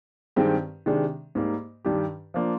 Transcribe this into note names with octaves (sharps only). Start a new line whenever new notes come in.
G2 D#3 G#3 C4 G4
C3 D#3 G#3 D4
G#2 G3 A#3
G2 D#3 G3 D4 G4
F3 A#3 D4 F4